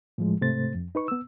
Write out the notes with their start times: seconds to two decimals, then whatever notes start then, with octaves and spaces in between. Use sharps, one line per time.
0.18 A2 F3 G#3
0.41 G#2 C3 A3 C5 A6
0.74 F2
0.95 D#4 B4 C#6
1.08 B3 E6